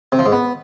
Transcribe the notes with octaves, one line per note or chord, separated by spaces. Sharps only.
C3
F3
G#2
B3